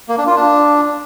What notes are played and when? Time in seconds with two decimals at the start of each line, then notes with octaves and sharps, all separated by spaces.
0.09 A#3
0.18 D4
0.27 F4
0.36 D4